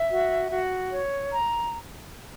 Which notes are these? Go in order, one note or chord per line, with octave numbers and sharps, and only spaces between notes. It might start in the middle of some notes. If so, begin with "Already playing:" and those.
Already playing: E5
F#4
F#4
C#5
A#5